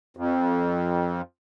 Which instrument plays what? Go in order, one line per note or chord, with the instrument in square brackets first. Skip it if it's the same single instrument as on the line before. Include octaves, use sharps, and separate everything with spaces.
[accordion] F2